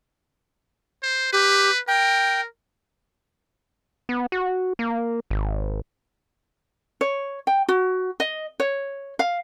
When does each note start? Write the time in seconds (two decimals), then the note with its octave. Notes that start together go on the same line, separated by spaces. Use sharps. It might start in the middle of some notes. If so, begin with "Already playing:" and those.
1.03 C5
1.33 G4 B4
1.88 A#4 G5
4.09 B3
4.32 F#4
4.79 A#3
5.31 G#1
7.01 C#5
7.47 G5
7.68 F#4
8.20 D#5
8.60 C#5
9.19 F5